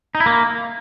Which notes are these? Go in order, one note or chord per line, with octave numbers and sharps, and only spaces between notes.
D#4
E4
A#3